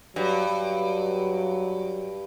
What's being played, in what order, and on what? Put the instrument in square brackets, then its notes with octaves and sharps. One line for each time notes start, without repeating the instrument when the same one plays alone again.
[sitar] G2 [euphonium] F#3
[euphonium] F#3